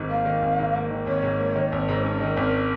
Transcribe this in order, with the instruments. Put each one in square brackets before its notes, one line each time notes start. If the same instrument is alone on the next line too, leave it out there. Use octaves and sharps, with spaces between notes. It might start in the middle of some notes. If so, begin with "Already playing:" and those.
Already playing: [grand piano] G#1 G#2 D#3
[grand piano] A#3 [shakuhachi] F5
[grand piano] D#3
G#1
G#2
A#3
D#3
[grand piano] G#1 [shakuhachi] C#5
[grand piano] G#2
A#3
D#3
G#1
G#2
[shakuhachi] C#5
[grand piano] C#4 [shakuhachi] A#4
[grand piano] D#3
G#1